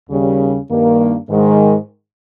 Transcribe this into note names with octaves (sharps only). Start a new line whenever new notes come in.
D#2 C#3 G3
G2 D#3 A#3
G#2 D#3 G#3